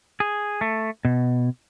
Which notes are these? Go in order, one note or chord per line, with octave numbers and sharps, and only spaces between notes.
G#4
A3
B2